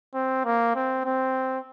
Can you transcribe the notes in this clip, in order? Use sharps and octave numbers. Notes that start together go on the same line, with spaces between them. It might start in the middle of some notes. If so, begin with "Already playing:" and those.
C4
A#3
C4
C4